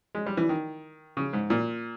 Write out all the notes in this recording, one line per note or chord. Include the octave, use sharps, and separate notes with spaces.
G#3
G3
E3
D#3
C#3
G#2
A#2